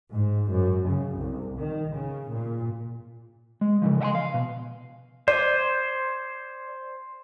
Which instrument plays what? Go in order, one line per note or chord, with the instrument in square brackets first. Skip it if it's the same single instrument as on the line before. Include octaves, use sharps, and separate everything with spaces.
[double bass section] G#2
F#2
C#3
C2
D#3
C#3
A#2
[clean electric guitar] G#3
C#3 E3 F3
D#5 E5 F#5 G#5 C6
F5
B2
[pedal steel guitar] C5 [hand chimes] D5